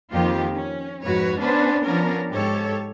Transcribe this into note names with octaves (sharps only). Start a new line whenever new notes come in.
F2 D#3 A#3 F4 G4
C#4
F2 G#2 F#4 B4 C#5
B3 C#4 D4 B4 C5
F3 B3 C#4 D4 A#4
G#2 G4 A4 C#5